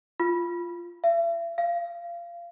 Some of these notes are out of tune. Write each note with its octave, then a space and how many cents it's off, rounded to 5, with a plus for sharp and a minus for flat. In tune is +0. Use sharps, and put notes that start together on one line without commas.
F4 -5
E5 +40
F5 -25